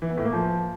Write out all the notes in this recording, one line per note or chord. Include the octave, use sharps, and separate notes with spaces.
E3
B3
A2
A#3
F3